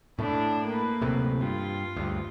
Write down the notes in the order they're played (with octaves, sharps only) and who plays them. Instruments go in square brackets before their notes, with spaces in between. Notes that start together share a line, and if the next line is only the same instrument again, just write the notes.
[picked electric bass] A2 A3 [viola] D4 E4
[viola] A#3 B4
[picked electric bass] D1 A2 C3
[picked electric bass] G2 [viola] F4
[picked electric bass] D2 G2